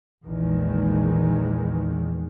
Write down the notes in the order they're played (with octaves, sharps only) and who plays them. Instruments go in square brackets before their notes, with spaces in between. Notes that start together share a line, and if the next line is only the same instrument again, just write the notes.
[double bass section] A#1 E2 D#3 E3 G#3